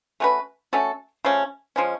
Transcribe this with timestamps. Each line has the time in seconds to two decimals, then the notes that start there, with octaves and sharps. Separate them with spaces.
0.20 A3 C#4 F#4 B4
0.73 A3 C#4 F#4 A4
1.25 C#3 F3 A3 C#4
1.76 F3 G#3 C#4